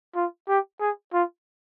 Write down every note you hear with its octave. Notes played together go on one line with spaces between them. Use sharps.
F4
G4
G#4
F4